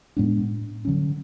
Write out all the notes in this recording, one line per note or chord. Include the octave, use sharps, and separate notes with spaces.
A2 G#3 B3 D4
D3 F#3 C#4